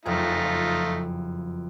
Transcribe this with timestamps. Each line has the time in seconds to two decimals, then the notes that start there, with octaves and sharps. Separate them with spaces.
0.06 F#1 F2 A3 D#4 F4 G#4